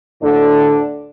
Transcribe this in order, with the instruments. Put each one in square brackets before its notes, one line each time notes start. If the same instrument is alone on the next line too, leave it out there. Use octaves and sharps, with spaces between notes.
[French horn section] D2 A2 D3 D4 A4